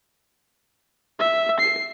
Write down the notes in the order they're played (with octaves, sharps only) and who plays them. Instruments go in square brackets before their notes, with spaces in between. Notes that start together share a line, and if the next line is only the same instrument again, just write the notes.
[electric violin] E5
C7